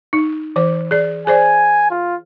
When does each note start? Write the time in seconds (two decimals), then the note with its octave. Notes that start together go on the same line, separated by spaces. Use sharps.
0.13 D#4
0.56 E3 C5
0.91 G#4 D5
1.27 G#4 C5 D5 G#5
1.91 F4